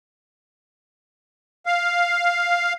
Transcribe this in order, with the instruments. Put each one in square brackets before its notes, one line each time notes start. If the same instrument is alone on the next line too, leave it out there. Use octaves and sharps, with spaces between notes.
[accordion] F5